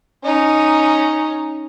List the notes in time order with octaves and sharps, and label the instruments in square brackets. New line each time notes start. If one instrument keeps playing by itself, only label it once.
[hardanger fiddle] C#4 D#4